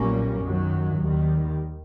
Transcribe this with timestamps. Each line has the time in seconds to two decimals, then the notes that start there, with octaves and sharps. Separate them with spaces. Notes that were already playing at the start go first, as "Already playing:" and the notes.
Already playing: B1 A#2 G3 A#3 C#4
0.42 F#2 D#3 F#3
1.01 D#2 D#3 G3